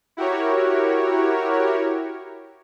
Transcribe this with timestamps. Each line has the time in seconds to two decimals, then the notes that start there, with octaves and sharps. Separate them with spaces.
0.17 E4 F#4 G4 A#4 C#5